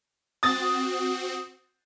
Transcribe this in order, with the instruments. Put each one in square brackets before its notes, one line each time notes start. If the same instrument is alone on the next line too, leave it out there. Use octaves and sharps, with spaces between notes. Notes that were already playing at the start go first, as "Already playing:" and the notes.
[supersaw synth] C4 F#4 [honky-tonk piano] D#6 A6